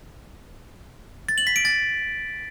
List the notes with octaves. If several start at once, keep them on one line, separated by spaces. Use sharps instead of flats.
A6
F#7
B6
D7
A6